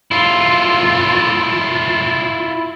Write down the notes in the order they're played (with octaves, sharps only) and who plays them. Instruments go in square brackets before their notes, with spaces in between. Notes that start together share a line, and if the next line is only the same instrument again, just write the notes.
[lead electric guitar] E4 F4